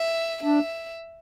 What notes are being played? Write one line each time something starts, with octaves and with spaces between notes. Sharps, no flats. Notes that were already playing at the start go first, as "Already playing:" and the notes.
Already playing: E5
D4 E5